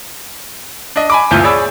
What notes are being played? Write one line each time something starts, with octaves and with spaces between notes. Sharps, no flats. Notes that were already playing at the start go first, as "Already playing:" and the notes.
D4 D#5
G#5 B5 D6
G1 D2 A#2 E3 F4 G6
G#4 C#5 D5 B5 E6